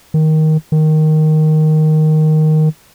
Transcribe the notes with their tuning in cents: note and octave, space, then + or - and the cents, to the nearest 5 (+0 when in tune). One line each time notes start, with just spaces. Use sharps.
D#3 +10
D#3 +0